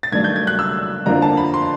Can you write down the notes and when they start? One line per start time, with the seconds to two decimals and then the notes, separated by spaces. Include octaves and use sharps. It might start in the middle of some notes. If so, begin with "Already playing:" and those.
0.03 A6
0.12 G2 D#3 F#3 A3 D4 G#6
0.24 G6
0.36 G#6
0.47 F#6
0.59 E6
1.06 F2 D3 F3 A#3 A#5
1.22 A5
1.37 B5
1.54 C6